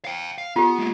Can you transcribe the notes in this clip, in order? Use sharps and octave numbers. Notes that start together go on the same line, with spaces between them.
F5 G5
F5
B3 F4 G4
G#3 A#3